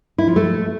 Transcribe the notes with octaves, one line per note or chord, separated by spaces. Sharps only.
E4
F3
A3